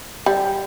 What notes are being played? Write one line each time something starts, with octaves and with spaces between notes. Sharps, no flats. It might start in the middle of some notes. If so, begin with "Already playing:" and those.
G3